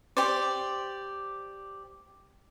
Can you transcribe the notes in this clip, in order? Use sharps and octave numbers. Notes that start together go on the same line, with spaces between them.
G4 C5 D5